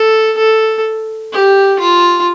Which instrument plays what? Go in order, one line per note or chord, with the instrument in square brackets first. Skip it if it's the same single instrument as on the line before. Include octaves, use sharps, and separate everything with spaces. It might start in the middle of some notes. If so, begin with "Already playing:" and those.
Already playing: [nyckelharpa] A4
A4
G4
F4